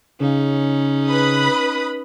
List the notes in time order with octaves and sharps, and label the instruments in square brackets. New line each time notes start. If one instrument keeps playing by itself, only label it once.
[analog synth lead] C#3 [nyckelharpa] C#4 D#4
[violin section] B4 B5 D#6